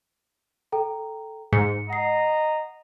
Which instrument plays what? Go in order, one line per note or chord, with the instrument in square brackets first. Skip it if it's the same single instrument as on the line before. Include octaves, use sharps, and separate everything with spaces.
[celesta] A4 G5 A#5
[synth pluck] G#2 [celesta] C#7
[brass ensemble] D#5 A#5 [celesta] F#5 C7